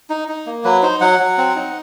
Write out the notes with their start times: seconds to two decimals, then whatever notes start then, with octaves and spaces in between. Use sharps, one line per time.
0.10 D#4
0.28 D#4
0.46 A#3
0.64 F#3 B4
0.83 D#4 C5
1.01 F#3 F#5
1.20 F#3
1.38 C4
1.55 D#4